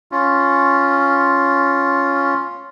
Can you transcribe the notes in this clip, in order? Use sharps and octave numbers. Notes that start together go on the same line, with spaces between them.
C#4 F4